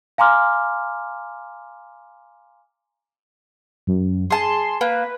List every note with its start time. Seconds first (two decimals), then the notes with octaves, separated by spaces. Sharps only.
0.18 F5 G#5 A#5 C6 D6 F6
3.87 F#2
4.30 G#4 A5 C6
4.81 A#3 B4